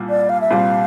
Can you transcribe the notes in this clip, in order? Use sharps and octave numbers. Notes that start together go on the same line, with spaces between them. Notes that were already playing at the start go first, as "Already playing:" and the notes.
Already playing: C2 A#2 G3
D5
F5
E5
C2 A#2 G3 C4 F5